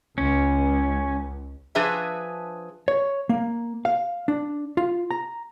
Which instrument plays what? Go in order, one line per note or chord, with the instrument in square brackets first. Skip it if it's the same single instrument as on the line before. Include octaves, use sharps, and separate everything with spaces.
[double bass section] C#2 [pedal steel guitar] C#4
[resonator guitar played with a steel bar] F3 D4 G#4 B4 E5 G#5
[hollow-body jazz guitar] C#5
A#3
F5
D4
F4
A#5